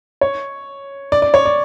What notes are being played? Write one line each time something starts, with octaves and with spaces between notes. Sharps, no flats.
C#5
D5
D5
C#5
D5